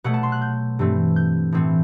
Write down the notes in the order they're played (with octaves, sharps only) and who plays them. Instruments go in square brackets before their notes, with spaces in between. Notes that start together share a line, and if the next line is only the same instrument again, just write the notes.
[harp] B2 F#3 A3 F#5
A5
C6
F#6
G6
G2 E3 A3 C4
G6
A2 E3 A3 C4